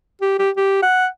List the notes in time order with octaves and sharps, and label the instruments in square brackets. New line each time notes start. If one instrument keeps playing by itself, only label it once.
[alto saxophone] G4
G4
G4
F#5